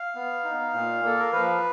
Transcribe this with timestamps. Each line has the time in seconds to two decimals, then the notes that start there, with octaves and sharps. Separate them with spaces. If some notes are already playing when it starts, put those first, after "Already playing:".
Already playing: F5
0.15 B3
0.44 D#4
0.73 A#2
1.03 A#3 A4
1.19 A#4
1.32 F3 B4